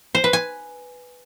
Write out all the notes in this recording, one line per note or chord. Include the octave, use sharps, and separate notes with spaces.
C5
B4
G#5